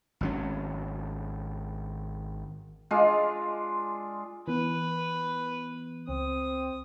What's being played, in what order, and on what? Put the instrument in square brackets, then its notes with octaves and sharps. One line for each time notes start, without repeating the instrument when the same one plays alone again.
[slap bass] G#1 F#3 C#4
[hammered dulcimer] G#3 D4 F4
[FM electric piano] E3 B3 [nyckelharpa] B4
[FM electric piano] C#2 [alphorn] C4 [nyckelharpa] D#6